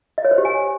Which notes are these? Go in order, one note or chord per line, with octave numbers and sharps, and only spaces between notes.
D#5
C#5
C5
G4
G#5